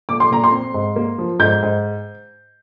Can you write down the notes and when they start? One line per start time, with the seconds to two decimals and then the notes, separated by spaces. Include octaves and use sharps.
0.09 A#2 D6
0.20 C6
0.31 A#2 A#5
0.44 C6
0.52 C4
0.74 G#2
0.96 A#3
1.18 F3
1.39 G#2 G6
1.62 G#2